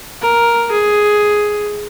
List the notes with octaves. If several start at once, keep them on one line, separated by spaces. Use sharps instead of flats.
A#4
G#4